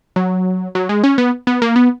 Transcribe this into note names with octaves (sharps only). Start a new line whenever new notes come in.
F#3
F#3
G#3
C#4
B3
B3
A#3
B3